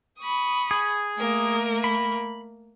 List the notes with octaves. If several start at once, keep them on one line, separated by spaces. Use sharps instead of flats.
B5 C#6 D#6
G#4
A3 A#3 A#4
B5